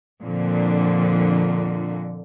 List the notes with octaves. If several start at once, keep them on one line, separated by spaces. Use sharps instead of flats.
F2 A#2 D3